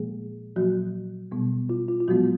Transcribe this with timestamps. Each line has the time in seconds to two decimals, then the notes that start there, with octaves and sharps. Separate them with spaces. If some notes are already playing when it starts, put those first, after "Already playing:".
Already playing: A#2 F3 G#3 A#3 G#4
0.56 A#2 F3 F#3 A#3 F#4
1.31 B2 G3 B3
1.69 F4
1.88 F4
2.00 F4
2.08 A#2 F3 F#3 G#3 B3 F#4